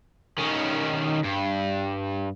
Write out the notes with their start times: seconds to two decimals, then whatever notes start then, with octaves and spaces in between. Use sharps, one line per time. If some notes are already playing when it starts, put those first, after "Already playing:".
0.38 D#3 C#4
1.24 G2